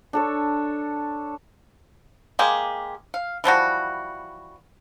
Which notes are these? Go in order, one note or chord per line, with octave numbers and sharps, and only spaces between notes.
D4 A4 C#5
G#3 A#3 G4 G#4
F5
E3 F3 G3 F#4